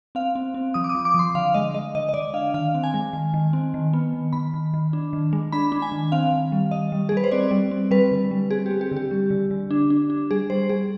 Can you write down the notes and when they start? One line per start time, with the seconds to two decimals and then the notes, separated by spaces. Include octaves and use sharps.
0.15 C4 F5
0.35 C4
0.54 C4
0.74 F3 D#6
0.84 D6
0.89 D#6
0.95 F3
1.05 D6
1.14 F3 C6
1.35 D3 F5
1.54 G#3 D#5
1.74 G#3 D#5
1.95 D3 D#5
2.09 D#5
2.14 D3 D5
2.34 D4 F5
2.54 D#3 F5
2.74 C4
2.84 G#5
2.94 G#3
3.13 D#3
3.34 D#3
3.53 C4
3.74 D#3
3.93 B3
4.14 D#3
4.33 D#3 B5
4.54 D#3
4.74 D#3
4.93 D4
5.13 D#3
5.33 G#3
5.52 D4 B5
5.72 D4
5.82 G#5
5.92 D#3
6.12 C4 F5
6.32 D#3
6.52 G3
6.71 D#3 D#5
6.92 G3
7.09 G#4
7.12 G3
7.17 B4
7.24 C5
7.31 C4 D5
7.51 G3
7.71 C4
7.91 G3 B4
8.11 D3
8.31 G3
8.51 C4 G#4
8.66 C4 G4
8.81 G4
8.92 D3 G4
9.11 G3
9.30 D3
9.51 D3
9.71 D4
9.90 D4
10.10 D4
10.31 G3 G#4
10.50 G3 C5
10.69 G3 G#4